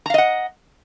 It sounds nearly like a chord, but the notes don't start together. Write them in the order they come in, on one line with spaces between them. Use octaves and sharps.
A#5 F5 D#5 F#5